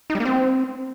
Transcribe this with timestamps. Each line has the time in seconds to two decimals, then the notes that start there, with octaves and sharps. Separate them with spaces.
0.10 D#4
0.15 G3
0.20 A#3
0.25 C4